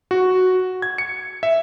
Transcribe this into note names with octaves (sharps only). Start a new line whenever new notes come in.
F#4
G#6
C#7
E5